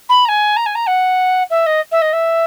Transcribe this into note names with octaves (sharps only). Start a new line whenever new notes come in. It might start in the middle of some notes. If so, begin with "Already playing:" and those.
B5
A#5
G#5
A#5
G#5
A#5
F#5
E5
D#5
E5
D#5
E5